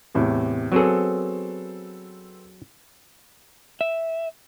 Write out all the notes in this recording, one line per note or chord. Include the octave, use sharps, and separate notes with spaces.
E2 A2 C3
F#3 B3 C4 F#4 G#4 A4
E5